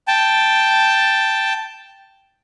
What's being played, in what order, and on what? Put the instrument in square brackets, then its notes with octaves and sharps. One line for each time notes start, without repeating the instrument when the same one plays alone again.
[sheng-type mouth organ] G5 A5